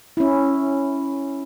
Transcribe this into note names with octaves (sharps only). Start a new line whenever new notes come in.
C#4 E4